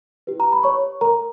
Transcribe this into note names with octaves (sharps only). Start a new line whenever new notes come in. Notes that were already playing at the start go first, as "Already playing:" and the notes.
E4 G4 B4
A#5
B5
C#5 C#6
A#4 A#5